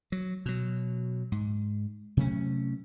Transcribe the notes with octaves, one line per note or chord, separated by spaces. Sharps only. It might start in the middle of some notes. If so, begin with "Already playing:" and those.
F#3
B2 F#3
G#2
C3 F#3 A3 C#4